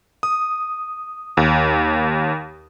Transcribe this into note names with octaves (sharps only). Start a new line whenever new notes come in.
D#6
D#2